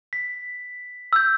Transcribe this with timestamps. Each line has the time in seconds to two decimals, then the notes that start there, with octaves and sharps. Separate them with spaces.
0.13 B6
1.13 E6 G6